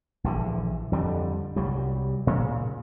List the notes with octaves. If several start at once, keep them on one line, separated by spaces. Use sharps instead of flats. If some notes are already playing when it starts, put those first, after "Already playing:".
A#1 D3 E3
F2 D3 G3
C2 F#3 G3
A#2 C#3